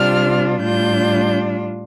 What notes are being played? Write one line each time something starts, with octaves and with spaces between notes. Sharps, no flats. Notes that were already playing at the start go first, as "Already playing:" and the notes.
Already playing: C3 G3 D4 F4 F6
A2 G3 D4 F4 G6